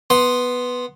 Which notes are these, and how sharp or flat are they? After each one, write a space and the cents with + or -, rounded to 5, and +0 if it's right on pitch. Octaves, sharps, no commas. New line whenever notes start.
B3 +0 C6 +0